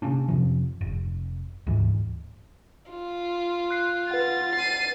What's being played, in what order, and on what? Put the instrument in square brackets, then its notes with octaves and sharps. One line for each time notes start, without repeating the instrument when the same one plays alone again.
[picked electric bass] C3 A#3 C#4 D4
F2 C3 F3
F1
D2 G#2 E3
[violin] F4
[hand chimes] F#6 C7
[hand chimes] B4 F#5 [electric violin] A6
[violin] C7 D#7